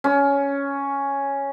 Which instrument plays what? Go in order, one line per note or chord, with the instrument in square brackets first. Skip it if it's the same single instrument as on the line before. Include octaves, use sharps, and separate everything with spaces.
[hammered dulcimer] C#4